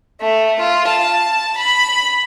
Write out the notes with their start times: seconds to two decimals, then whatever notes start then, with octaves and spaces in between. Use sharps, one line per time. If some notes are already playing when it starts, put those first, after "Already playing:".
0.21 A3
0.60 F4
0.89 A5
1.58 B5